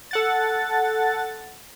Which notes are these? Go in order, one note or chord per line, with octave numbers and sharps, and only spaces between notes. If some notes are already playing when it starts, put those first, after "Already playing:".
A4 F#5 A6